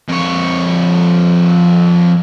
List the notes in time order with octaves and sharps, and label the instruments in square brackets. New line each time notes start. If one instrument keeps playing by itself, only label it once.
[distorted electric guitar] F2 C#5